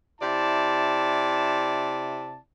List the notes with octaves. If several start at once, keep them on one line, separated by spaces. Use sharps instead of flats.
C3 E4 D5 A5